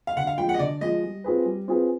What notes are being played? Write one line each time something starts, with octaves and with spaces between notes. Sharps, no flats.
F5
D3 F#5
F5
F3 G#3 G5
F#5
D#5
D3 D5
F3 G#3 D#5
G3
C4 F4 G#4 B4
G3
C4 F4 G#4 B4